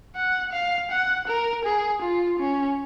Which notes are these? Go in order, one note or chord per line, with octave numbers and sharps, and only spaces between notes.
F#5
F5
F#5
A#4
G#4
F4
C#4